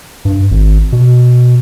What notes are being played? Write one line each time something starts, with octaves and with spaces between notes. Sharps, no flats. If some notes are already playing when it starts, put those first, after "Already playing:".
G2
G#1
B2